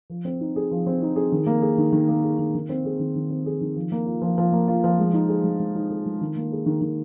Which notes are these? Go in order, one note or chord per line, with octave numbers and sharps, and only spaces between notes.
F3
C4
D#4
G#4
F3
C4
D#4
G#4
D#3
A#3
G#4
D#3
D#3
A#3
G#4
D#3
D#3
C4
G#4
D#3
D#3
C4
G#4
D#3
F3
A#3
F4
F3
F3
A#3
F4
F3
G#3
D#4
G#4
G#3
G#3
D#4
G#4
G#3
D#3
A#3
G#4
D#3
D#3